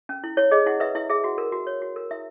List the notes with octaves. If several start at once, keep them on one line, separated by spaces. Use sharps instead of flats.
C#4
E4
E4 C#5
G#4 D#5
E4 F#5
B4 E5
E4 E5
G#4 E5
F#4 F#5
A#4
F#4
C#5
F#4
A#4
E4 E5